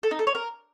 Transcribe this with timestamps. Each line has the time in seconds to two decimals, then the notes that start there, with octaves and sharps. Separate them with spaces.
0.03 A4
0.11 D#4
0.19 A4
0.27 C#5
0.35 A#4